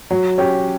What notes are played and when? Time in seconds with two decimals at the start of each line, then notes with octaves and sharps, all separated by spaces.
0.11 F#3
0.38 C#4 G4